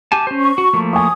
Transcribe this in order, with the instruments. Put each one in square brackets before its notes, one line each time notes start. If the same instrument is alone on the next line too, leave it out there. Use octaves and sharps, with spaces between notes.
[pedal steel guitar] G4 G#5 A5
C#4 C5
[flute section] C#6
[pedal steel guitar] F#4
F3 A3 A#3
[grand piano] G#5 C#6 [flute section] D#6